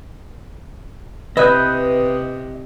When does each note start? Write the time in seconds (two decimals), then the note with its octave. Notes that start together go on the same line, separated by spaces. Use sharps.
1.37 C3 E4 B4 D#5 E5 D#6 F#6 G6